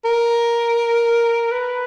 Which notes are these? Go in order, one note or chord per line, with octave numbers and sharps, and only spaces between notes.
A#4
B4